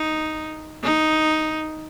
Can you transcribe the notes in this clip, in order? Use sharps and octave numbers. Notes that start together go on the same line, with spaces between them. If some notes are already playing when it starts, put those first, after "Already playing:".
Already playing: D#4
D#4